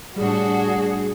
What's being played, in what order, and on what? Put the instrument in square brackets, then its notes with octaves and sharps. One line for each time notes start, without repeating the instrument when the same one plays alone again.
[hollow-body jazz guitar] A2 G3 [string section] D4 F#4 [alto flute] G#4